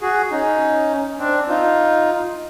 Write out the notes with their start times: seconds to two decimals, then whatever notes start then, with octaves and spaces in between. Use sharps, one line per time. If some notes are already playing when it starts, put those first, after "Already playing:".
0.02 F#4 G#4
0.31 C#4 D#4
1.19 C4 D4
1.49 D#4 F4